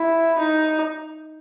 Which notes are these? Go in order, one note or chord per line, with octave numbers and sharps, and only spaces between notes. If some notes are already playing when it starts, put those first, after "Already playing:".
Already playing: E4
D#4